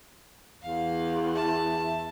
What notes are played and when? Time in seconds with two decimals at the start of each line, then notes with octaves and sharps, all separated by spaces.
0.62 E2 F5
1.35 E5 A5